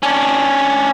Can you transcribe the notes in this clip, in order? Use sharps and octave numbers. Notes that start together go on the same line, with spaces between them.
C#4 D4